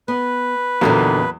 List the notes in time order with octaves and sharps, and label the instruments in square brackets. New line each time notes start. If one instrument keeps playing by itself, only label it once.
[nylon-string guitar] B3 [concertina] B4
[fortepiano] E2 F#3 A#3 [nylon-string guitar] A#2 D3 D#3